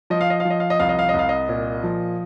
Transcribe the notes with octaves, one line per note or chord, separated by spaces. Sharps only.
F3 D#5
F5
D#5
F5
F3
D#5
F5
D#5
C2 F5
D#5
F5
C2 D#5
F5
D#5
A#2
F3